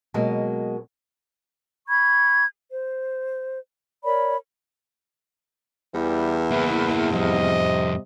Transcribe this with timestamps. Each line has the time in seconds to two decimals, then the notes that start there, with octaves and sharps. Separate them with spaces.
0.14 B2 F#3 G#3 A#3
1.87 B5 C#6 G#6
2.71 C5
4.03 A#4 C#5 D5 B5
5.95 E2 E3 G3
6.51 A#3 E4 B4
7.12 F2 C3 G3 D#5